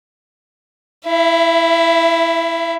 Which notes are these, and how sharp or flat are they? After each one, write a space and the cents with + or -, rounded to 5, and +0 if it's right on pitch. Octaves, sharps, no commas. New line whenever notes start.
E4 +0 E5 +35